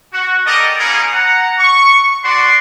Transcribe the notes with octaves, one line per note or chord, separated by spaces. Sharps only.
F#4
G4 A4 A#4 D5 D#5
A#3 B3 C#4 D#4 G#4 A#4
F#5 A#5
C#6
F#4 D5 C6